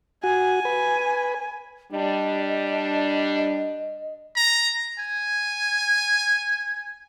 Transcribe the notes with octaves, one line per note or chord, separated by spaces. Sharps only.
F#4 G#5
B4
G3 D4 D#5
A#5
G#5